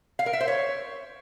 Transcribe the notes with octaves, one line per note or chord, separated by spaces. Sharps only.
F5
A#4
E5
C5
C#5